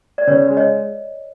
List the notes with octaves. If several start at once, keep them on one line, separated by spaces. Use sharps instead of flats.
D5
C#3 B4 C#5
G#3
C#5 D#5